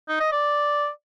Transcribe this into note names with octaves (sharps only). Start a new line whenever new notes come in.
D#4
D#5
D5